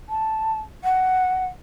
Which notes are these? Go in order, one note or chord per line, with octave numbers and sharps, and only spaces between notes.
A5
F#5